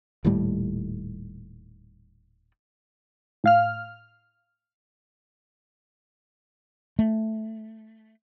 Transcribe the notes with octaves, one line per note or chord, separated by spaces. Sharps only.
D#1 D#2 A2 G3
A2 F5 F6
A3